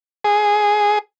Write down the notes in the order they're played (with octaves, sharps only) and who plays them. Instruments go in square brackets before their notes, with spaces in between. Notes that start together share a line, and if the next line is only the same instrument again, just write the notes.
[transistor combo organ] G#4